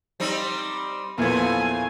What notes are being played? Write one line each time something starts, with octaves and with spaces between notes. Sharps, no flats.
G3 C4 D#4
E2 A#2 E3 F3 A3 G#5